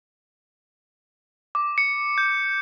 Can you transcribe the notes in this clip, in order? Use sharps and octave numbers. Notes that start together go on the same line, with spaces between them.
D6
C#7
G6